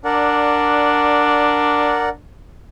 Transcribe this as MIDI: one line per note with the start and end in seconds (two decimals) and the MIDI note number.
0.05 2.20 62
0.05 2.09 70
0.05 2.09 74
0.05 2.09 78